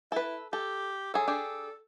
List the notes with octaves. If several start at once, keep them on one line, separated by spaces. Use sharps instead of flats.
E4 A4 B4
G4 A4
F#3 G#4 A4
D4 G4 G#4